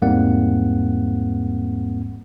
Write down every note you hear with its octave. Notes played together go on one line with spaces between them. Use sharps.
E2 G#2 G3 A#3 C4 F#5